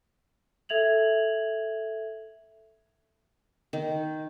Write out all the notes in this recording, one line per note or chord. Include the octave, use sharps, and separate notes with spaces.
A4 E5 G#6 F7 F#7
D#3